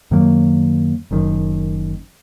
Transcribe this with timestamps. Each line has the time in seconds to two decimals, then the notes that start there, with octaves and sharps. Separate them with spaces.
0.11 F#2 D#3 F#3 A#3
1.11 F#1 F#2 D#3